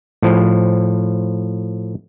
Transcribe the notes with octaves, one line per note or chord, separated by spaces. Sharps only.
A2 F3